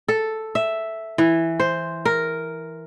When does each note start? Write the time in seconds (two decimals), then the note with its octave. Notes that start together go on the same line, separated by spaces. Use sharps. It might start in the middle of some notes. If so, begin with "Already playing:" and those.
0.08 A4
0.55 E5
1.18 E3
1.60 C5
2.05 A#4